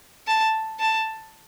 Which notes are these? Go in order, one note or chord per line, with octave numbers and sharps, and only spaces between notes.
A5
A5